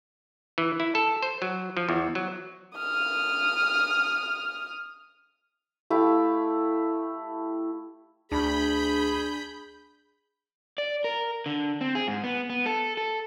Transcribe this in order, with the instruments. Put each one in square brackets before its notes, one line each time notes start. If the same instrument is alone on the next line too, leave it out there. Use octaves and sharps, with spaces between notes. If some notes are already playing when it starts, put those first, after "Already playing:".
[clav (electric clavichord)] E3
E4
A4
C5
F#3
F3
E2
F#3
[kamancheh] D#6 F6
[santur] A3 E4 G4 F5
[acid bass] D2 [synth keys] D4 [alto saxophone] G#4 [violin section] B5 G6
[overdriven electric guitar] D5
A#4
D3
C4
G#4
G#2
B3
B3
A4
A4